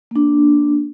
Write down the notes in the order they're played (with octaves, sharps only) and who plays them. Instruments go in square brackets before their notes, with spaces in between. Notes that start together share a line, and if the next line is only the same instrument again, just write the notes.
[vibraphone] A#3 D4